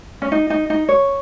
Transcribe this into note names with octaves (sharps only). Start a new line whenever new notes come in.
C#4
D#4
D#4
D#4
C#5